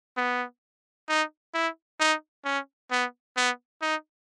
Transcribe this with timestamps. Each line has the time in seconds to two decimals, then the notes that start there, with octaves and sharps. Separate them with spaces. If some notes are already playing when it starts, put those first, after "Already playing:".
0.17 B3
1.08 D#4
1.54 E4
2.00 D#4
2.45 C#4
2.91 B3
3.37 B3
3.82 D#4